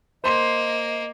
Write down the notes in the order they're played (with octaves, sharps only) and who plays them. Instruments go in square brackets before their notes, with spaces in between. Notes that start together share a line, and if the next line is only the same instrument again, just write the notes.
[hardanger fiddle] A#3 [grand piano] C5 C6 [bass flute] D#5